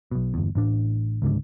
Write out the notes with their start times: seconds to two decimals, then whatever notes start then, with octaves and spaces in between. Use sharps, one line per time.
0.11 B1 B2
0.34 G1 E2
0.55 A1 A2 D4
1.22 C#2 G#2 D3